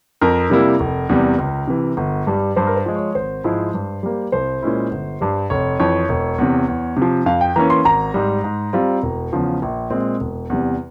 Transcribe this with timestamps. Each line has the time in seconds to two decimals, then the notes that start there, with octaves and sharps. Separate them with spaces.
0.21 F2 A#4
0.50 C3 G3 A#3 E4
0.80 F1
1.09 E2 C3 G3
1.38 C#2
1.68 C3 E3
1.97 G1
2.27 G2 G3
2.56 G2 C5
2.67 A#4
2.76 C5
2.86 F3 G#3
2.96 C#5
3.15 G#1 C5
3.44 G#2 F3 G#3 E4
3.74 G2
4.03 G3 A#3
4.32 C2 C5
4.62 A#2 G#3 C#4 E4
4.91 G1
5.21 G2 G3
5.50 F1 C#5
5.80 F2 E3 C#5
6.09 E1
6.38 E2 C3
6.68 E2
6.97 C3
7.02 F3
7.26 F2 F5
7.41 G5
7.56 E3 A#3 C#4 A#5
7.70 C6
7.85 G#1 A#5
8.14 G#2 G3
8.44 G#2
8.73 G3 C4 F4
9.03 E1
9.33 E2 C#3 F3
9.62 A#1
9.90 A#2 G#3 C4
10.20 E1
10.50 E2 C3 G3